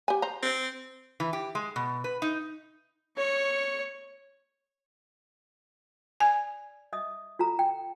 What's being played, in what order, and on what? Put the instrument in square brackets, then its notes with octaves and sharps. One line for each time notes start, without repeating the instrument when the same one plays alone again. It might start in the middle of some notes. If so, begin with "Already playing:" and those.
[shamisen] G4 G#5
C5 A#5
[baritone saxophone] C4
[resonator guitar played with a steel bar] E3
G4
G#3
B2
B4
D#4
[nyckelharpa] C#5 C#6
[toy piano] D5 [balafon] G#5
[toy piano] D#5 E5 D#6
F4 A4 A#5
G5